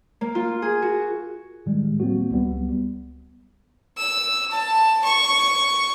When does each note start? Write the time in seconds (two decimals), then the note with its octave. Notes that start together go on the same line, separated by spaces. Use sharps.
0.21 A#3
0.35 F4
0.62 G#4
0.82 F#4
1.66 A2 D#3 G3 G#3
2.00 F#3 A#3 C4 F#4
2.31 C#2 G3 B3
3.98 E6
4.51 A5
5.04 C#6